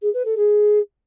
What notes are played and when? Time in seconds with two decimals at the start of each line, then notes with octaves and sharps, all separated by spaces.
0.02 G#4
0.13 B4
0.25 A4
0.37 G#4